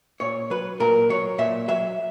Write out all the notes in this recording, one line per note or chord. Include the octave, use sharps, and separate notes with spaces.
A#2 C#5
F#3 B4
A#2 A#4
F#3 C#5
A#2 E5
F#3 E5